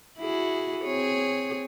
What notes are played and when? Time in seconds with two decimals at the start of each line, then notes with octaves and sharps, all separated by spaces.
0.19 E4 F#4 G#4
0.85 C4 G#4 C#5